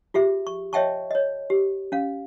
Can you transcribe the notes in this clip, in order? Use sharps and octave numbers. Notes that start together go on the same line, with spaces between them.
F4 G4 G#4 E5
C#6
C#5 D#5 E5 G5 A5 C#6
C#5 D#5
G4
C#4 F5